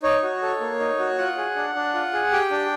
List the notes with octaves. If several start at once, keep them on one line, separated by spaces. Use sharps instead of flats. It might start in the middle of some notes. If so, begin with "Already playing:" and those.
D#4 C#5
F#4
A4
A#3
D#4
F#4
F4 F#5
G#4
D4
D4
F4
G#4
G4 G5
D4